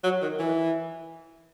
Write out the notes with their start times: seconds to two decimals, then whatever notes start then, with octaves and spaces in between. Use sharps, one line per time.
0.04 F#3
0.22 D#3
0.39 E3